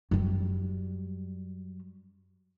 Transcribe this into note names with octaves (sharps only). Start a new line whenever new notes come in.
F#2 G3